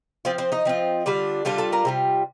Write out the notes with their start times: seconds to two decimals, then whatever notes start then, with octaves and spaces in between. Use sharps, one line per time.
0.25 F3 C4 F4 F5
0.38 C4 C5
0.52 D#4 D#5
0.65 F3 C4 F4
1.06 D3 G3 D4 F4
1.45 D3 G3 D4 F4 F5
1.58 A4 A5
1.73 A#4 A#5
1.85 C3 G3 F4